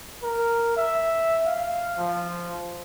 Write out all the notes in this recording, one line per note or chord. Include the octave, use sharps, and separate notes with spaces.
A#4
E5
F5
F3